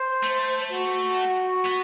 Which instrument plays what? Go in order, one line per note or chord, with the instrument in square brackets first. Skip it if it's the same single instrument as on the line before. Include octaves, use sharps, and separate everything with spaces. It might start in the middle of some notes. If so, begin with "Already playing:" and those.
Already playing: [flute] C5
[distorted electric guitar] A3
[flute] F#4
[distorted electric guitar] B3